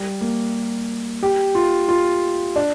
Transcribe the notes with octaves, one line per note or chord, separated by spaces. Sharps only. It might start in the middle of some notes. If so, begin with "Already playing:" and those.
Already playing: G3
A#3
G4
F4
F4
D4